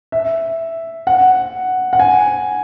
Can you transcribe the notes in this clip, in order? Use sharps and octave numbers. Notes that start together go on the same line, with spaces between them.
E5
F#5
F#5
G#5